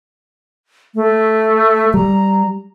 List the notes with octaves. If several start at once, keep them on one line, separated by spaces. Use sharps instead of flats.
A3
G3 A#5